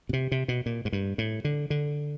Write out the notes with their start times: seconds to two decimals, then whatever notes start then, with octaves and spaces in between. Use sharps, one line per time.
0.09 B2
0.13 C3
0.32 C3
0.48 B2
0.66 A#2
0.85 G#2
0.93 G2
1.18 A2
1.45 D3
1.70 D3